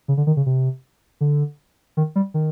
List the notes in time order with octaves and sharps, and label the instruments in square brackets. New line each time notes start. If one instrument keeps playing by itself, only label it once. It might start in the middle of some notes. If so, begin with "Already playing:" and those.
[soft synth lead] C#3
D3
D#3
C#3
C3
D3
D#3
G3
D#3